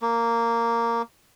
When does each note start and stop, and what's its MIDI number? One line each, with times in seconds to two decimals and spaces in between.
0.02 1.02 58